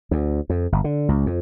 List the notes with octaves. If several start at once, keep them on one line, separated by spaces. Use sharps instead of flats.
D2
F2
G1
D3
C#2
F2